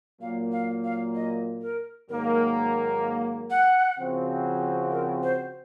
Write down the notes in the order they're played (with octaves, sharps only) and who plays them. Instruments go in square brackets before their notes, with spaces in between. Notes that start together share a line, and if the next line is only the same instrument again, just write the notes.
[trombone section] A#2 F#3 A#3 [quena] F5
[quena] F5
F5
D#5
A#4
[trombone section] G#2 D#3 F#3 A#3 [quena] A#4
[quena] F#5
[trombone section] C#3 F3 C4 F#4
[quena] A#4
C5